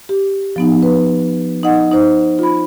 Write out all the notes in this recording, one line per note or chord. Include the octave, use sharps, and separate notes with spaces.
G4
F3 B3 D#4
B4
D#4 D#5 F#5
D#4 C5
F4 B5